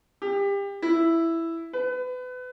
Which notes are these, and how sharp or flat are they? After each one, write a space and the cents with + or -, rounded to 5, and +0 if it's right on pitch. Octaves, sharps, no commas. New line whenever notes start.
G4 +30
E4 +5
B4 +30